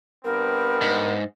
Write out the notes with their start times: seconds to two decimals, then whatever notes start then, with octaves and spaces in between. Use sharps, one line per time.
0.24 G2 B3 C4 A#4
0.81 G#2